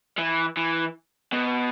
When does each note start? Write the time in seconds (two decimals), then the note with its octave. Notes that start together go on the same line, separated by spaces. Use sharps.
0.18 E3
0.57 E3
1.33 B2